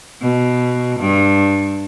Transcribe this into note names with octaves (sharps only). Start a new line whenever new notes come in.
B2
G2